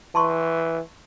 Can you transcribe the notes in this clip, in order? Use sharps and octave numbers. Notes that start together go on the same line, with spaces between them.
E3 A5 C6 C#6